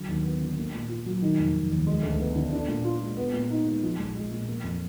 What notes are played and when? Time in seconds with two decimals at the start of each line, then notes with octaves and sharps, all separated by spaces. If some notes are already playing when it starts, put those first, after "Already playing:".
Already playing: D3 F#3
0.08 D#2
0.24 B3
0.41 D3
0.57 A#3
0.73 A#2
0.89 F4
1.06 F#3
1.22 D#3
1.38 F1
1.55 F1
1.71 D#2
1.87 G#3
2.03 D2
2.20 B3
2.36 D3
2.53 D4
2.68 A#2
2.84 F4
3.01 G#3
3.17 B3
3.34 A#2
3.50 D#4
3.66 G#3
3.83 F3
3.99 A#1
4.15 G#3
4.31 A#2
4.48 A#3
4.64 F2